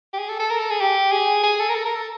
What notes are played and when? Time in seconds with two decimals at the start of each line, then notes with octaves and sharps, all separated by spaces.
0.13 G4
0.19 G#4
0.29 A4
0.40 A4
0.50 A#4
0.59 A4
0.70 G#4
0.81 G4
1.12 G#4
1.43 G#4
1.59 A4
1.69 A#4
1.75 A4
1.86 A#4
1.95 A4